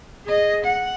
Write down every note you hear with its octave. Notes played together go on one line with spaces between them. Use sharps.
G#4 D#5
F#5